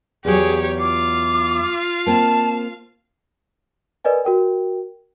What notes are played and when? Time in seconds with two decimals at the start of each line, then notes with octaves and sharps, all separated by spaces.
0.25 E2 F#3 G4 G#4 C#5
0.80 F4 F5 D6
2.06 A#3 C4 A5
4.04 A#4 B4 D5 D#5 G#5
4.25 F#4 A#4 G5